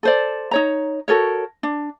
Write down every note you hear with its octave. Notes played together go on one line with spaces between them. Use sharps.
A4 C5 D5
D#4 C#5 A#5
F#4 A4 A#4 C#5
D4